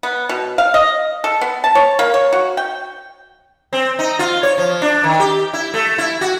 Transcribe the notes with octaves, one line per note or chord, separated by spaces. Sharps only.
B3
B2
F5
D#5
A4
B3
A5
C#5
A#3
C#5
F#4
G5
C4
D#4
F4
C#5
F3
D4
D#3
G4
E4
A3
E4
F#4